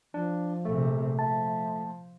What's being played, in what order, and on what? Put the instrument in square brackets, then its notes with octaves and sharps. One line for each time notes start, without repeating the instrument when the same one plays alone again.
[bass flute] F3 [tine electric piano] D4
[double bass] A#1 C3 [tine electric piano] A3
[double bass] F3 [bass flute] E5 [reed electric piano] A5